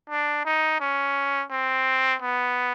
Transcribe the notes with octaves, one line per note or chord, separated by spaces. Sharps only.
D4
D#4
C#4
C4
B3